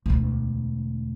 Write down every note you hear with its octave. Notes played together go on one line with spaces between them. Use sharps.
E1 D2